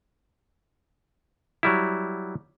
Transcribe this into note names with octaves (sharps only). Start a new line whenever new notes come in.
F#3 G3 E4